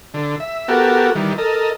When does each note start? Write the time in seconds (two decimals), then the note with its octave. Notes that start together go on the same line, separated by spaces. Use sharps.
0.14 D3
0.40 E5
0.68 B3 F#4 G4 A4 A#4
1.15 D#3 E3 G3
1.38 A4 A#4 D#5